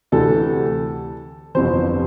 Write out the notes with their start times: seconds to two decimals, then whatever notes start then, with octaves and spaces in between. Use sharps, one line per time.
0.12 D2 C3 E3 A4
1.55 G1 F2 C3 E3 C5